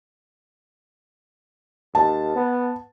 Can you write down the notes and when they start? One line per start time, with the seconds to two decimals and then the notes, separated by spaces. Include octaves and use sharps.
1.95 D#2 A5
2.36 B3